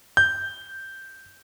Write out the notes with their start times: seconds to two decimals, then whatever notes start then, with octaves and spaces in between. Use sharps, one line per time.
0.17 G6